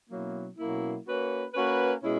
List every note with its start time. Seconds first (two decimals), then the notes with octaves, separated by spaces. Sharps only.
0.09 B2 F#3 A#3 C#4 E4
0.58 B2 F#3 A#3 C#4 E4
1.06 A#3 C#4 F#4 B4
1.54 A#3 C#4 F#4 B4
2.03 B2 G#3 C#4 E4